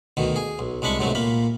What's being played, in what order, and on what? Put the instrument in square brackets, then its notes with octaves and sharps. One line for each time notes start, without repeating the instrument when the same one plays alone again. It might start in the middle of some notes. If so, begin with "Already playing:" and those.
[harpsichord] D2 B2 D#3
G#4
B1
C2 G#3 D4 B5 C#6
B1 G#2 C3 F#3 A3
A#2 A#3 B5